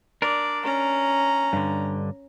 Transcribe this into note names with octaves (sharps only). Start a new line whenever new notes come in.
D4 A#4 D5
C#4 A#5
G2 D3